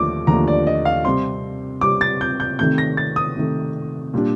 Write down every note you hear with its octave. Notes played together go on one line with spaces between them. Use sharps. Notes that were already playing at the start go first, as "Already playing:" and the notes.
Already playing: D#2 D3 F3 A3 D4 D6
D#2 D3 F3 A3 D4 A#5
D5
D#5
F5
C3 G3 C4 C6
C3 G3 C4 D6
A6
G6
G6
C3 D#3 A3 G6
A#6
A6
D#6
C3 D#3 A3
A#2 G3 D4